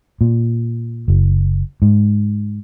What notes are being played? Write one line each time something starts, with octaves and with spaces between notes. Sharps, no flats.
A#2
F#1
G#2